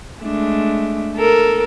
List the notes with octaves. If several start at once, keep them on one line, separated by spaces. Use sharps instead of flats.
G#3 A3 D4
A4 A#4